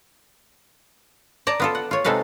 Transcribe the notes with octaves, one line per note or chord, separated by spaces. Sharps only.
D5 A5 A#5
B3 F4 A4
F#5
F4 C#5
C3 G#3 D#4 A4 B4 F5